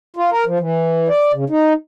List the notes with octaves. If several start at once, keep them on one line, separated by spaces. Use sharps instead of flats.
F4
A#4
F3
E3
D5
C#3
D#4